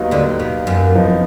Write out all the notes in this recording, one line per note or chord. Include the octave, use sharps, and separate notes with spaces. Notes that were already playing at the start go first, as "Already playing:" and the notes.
Already playing: D#2 D#3 F#3 B3 D#4
D2 D3
B2
F#2
F#1 F2 F3 B3 D#4